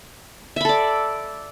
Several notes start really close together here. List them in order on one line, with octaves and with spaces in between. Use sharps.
E5 B5 A4 D5